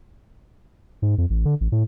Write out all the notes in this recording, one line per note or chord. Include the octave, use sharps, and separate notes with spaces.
G#2
F2
A1
D3
A1
A2